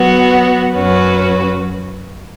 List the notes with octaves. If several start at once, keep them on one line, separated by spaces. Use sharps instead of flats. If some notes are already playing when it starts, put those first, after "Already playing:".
Already playing: F#3 B3 F#4
F#2 F#3 C#4 F#4 B4